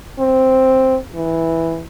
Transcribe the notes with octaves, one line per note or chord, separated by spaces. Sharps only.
C4
E3